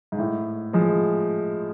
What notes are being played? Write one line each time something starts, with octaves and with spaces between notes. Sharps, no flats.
G#2
A2
F3 G#3